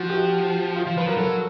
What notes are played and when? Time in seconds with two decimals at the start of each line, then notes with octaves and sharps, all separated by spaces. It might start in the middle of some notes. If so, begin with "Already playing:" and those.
Already playing: F3 F#4
0.10 G4
0.14 F#4
0.76 F4
0.87 F3
0.97 F3 B4
1.07 F#3 A#4
1.17 F#3 A4